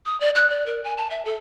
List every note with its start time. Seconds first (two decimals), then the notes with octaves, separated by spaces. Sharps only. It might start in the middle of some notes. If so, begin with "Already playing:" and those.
0.06 D#6
0.20 D5
0.35 F#6
0.50 D5
0.66 A#4
0.84 G#5
0.97 A5
1.10 E5
1.25 A4